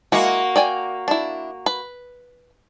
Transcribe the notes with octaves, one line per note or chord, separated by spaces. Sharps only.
G#3 A#3 E4 F#4
D5 G5 G#5
D4 E4
B4